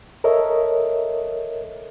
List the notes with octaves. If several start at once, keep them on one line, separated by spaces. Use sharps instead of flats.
A4 A#4 C#5 D#5 E5